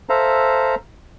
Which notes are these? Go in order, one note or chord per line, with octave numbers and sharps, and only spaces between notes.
A4 C5 E5 F5 A#5